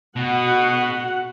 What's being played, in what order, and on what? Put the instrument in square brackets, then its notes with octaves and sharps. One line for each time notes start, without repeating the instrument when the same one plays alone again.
[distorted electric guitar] B2 [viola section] F#4 F#5